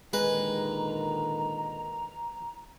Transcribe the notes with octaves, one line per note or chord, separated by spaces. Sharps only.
A#2 D3 D#3 G#3 B4 A#5